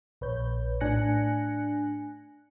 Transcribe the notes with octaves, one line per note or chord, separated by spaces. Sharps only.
A#1 B4 C#5 G6
A2 D4 G#5 F#6 A#6 C#7